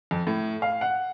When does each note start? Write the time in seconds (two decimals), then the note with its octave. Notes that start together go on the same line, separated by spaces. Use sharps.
0.11 F2
0.27 A2
0.62 F5
0.81 F#5